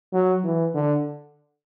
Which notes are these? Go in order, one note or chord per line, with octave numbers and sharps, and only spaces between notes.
F#3
E3
D3